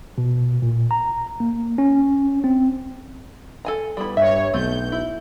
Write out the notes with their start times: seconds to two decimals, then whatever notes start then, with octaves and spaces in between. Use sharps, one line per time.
0.18 B2
0.62 A#2
0.91 A#5
1.40 A#3
1.78 C#4
2.44 C4
3.65 A4 G#5 A#5
3.97 G3 B3 E4
4.17 G2 C#5 E5
4.54 B1 A3 C4 G6
4.92 E4